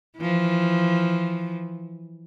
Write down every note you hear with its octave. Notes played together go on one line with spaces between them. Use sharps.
E3 F3